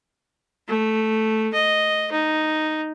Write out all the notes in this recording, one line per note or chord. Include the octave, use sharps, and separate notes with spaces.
A3
D#5
D#4